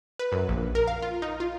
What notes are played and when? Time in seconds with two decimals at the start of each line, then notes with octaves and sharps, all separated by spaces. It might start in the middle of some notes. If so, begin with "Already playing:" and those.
0.19 B4
0.32 F#2
0.49 A#1
0.75 A#4
0.87 F5
1.02 F4
1.22 D#4
1.40 F4